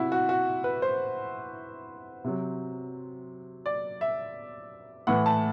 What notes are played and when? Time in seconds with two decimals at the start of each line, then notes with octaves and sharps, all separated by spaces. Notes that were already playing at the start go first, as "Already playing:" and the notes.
Already playing: C3 E4 F#4
0.12 F#4
0.29 F#4
0.64 B4
0.82 C5
2.24 C3 F#3
3.66 D5
4.01 E5
5.07 A2 E3 F#5
5.26 A5